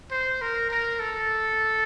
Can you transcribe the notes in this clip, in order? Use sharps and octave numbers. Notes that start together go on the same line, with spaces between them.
C5
A#4
A#4
A4